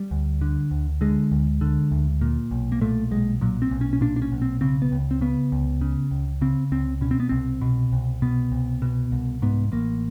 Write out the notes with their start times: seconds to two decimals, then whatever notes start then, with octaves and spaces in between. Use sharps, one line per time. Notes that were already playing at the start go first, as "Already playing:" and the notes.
Already playing: G3
0.11 D2
0.41 D3
0.71 D2
1.01 D3 G#3
1.32 D2
1.61 D3
1.91 D2
2.21 A#2
2.51 B1
2.72 A#3
2.81 A#2 A3
3.11 B1 G#3
3.41 A#2 F#3
3.62 C4
3.71 B1
3.81 C#4
3.93 C#4
4.01 A#2 D4
4.16 D4
4.22 C#4
4.32 B1
4.42 C4
4.61 C#3 C4
4.82 B3
4.92 C#2
5.11 C4
5.21 C#3 B3
5.52 C#2
5.81 C#3
6.11 C#2
6.41 C#3 C4
6.72 C#2 C4
7.01 B2 C#4
7.11 C4
7.20 B3
7.29 C2 C4
7.61 B2
7.92 C2
8.22 B2 B3
8.52 C2
8.82 B2
9.12 C2
9.42 G#2 B3
9.72 A1 A#3